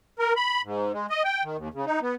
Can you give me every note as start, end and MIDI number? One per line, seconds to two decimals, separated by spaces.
0.19 0.33 70
0.36 0.62 83
0.64 0.92 44
0.93 1.06 56
1.10 1.23 75
1.24 1.43 79
1.43 1.57 51
1.57 1.69 39
1.74 1.85 49
1.86 2.00 63
2.02 2.15 59